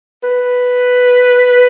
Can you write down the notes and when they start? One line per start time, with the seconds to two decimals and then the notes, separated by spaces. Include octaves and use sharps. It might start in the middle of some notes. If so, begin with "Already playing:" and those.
0.23 B4